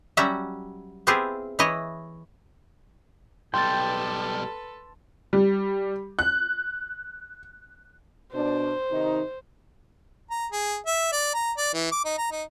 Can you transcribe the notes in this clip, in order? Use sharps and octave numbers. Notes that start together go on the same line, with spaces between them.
F#3 G3 C#4 F#4 E5 F#5
B3 C4 E4 F4 G4 G#4
E3 E4 C#5 D#5
B1 G3 A4 B4 G5 C6 A6
G3
F#6
B2 D4 C5
C3 D#3 D#4
A#5
G#4
E5
D5
A#5
D5
E3
D6
D#4
A#5
D#4